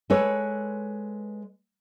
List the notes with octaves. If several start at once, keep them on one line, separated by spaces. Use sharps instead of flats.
G#3 A4 B4 C#5